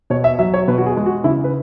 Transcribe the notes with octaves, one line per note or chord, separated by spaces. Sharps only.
B2 C#5
E5
F#3 E5
C#5
B2 B4
F#4
G#4
G#3
F#4
C#3 E4
B4